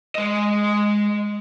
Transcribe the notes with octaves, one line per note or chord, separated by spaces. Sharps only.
G#3 D#5